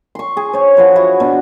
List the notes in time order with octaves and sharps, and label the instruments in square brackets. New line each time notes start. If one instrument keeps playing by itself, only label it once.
[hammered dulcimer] C6 C#6
G#4
C5 C#5
F3 B4 F#5
E4 F#4
B2 D4